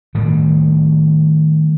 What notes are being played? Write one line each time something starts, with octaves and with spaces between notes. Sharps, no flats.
A2 D#3 G3